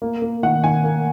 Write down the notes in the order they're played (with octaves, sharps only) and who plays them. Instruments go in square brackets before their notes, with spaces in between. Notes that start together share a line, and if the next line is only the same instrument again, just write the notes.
[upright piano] A#3
A#3
D#3 F#5
D#3 G#5
A#3